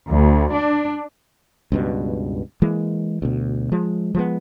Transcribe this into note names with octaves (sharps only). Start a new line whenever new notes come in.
D2
D4
C#2 G2 B2
E3 G#3 A#3
D2 B2
F3 G#3
F3 G#3 B3